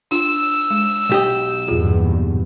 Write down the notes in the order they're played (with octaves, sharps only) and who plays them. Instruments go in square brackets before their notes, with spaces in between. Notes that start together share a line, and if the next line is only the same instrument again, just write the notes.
[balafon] D4 F4 [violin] E6
[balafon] G#3
[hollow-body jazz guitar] B1 G4 D#5
[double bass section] E2 G2 A#2 [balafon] F4 G#4